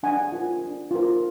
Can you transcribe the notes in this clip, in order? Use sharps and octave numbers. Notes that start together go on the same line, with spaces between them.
D4 F#5 G#5
F4 A#4
D4
F4 A#4